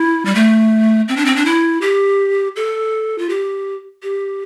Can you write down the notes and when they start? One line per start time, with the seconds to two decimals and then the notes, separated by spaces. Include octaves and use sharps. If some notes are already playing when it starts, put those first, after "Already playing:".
Already playing: E4
0.25 G3
0.35 A3
1.08 C4
1.17 D4
1.25 C4
1.36 D4
1.45 E4
1.81 G4
2.56 A4
3.18 F4
3.29 G4
4.03 G4